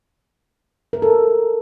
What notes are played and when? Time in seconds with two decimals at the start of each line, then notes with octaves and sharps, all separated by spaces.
0.93 A#4
1.02 A4